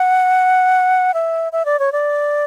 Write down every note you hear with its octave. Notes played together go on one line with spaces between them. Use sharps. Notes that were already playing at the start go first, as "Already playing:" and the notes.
Already playing: F#5
E5
E5
D5
C#5
D5